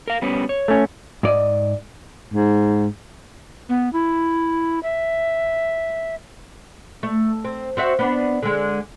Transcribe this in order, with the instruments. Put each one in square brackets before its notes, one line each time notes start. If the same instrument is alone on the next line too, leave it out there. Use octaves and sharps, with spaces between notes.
[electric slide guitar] A#4 F5
G3 B3 C#4
C#5
[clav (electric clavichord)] A3 C#4
[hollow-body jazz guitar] G#2 D5 D#5
[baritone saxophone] G#2
[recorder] B3
E4
E5
[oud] A3
C4
C4 F#4 E5
B3 D4
D3 G#3